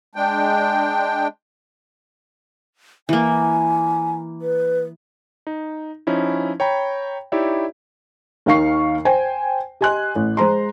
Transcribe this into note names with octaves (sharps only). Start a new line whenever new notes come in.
G#3 D4 G5
E3 A#3 G#5
B4
D#4
F3 C#4 D#4 E4
C#5 G5 A#5 B5
D#4 E4 G4 C#5 D5 E5
D#2 D#3 D#4 F5 C#6 C7
C5 G5 G#5
G4 D#5 G#5 C6 F#6
A1
G#3 C5 A#5 C6